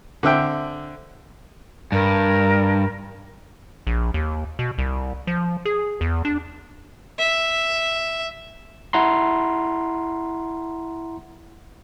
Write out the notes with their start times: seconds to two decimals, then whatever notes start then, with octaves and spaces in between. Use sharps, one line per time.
0.23 D3 C4 E5 G5
1.92 G2 A#4
3.87 A#1
4.14 D#2
4.59 B2
4.78 C2
5.27 F3
5.65 G#4
6.01 E2
6.25 D4
7.19 E5
8.93 E4 F#5 A#5 C6